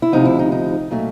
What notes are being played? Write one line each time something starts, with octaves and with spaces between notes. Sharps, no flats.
E4
D2 C3 F3 D#4
E4
D#4
D#4
A#2 F#3 A3